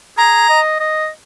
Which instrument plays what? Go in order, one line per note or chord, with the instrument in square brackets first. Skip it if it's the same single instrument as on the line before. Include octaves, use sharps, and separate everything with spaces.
[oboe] G#4 [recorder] A#5
[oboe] D#5
D#5